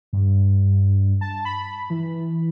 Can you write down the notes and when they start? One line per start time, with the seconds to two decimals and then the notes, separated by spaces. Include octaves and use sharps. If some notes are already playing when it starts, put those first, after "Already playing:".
0.13 G2
1.21 A5
1.45 B5
1.90 E3